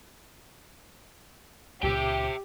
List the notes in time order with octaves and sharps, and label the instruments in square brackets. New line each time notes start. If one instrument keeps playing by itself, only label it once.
[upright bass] C#2 A#2 [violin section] G4 [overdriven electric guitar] E5 G5